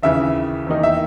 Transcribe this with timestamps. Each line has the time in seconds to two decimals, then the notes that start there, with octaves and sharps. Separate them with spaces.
0.03 D#2 C#3 E3 E5
0.67 E2 D#3 A#3 D#4
0.83 E5